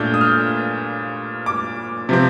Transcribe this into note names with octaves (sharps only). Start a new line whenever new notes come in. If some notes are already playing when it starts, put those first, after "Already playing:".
Already playing: A#2 A3 D4 G6
D#6
F6
D6
C3 F3 C4